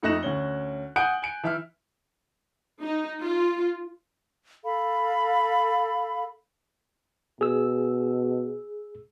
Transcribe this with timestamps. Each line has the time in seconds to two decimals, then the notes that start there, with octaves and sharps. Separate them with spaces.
0.03 F2 A3 D#4 F#6 A#6 E7
0.23 D2 C#4 G7
0.96 F#5 G#5 D#6 F#6 G6 D7
1.22 G#5 D7
1.43 E3 E5 F6
2.83 D#4
3.23 F4
4.64 A4 F5 B5
7.41 B2 G#4 E6